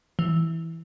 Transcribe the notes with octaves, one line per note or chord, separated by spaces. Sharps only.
E3